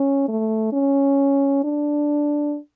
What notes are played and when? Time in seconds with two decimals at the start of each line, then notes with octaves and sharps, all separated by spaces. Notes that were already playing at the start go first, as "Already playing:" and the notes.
Already playing: C#4
0.28 A3
0.73 C#4
1.64 D4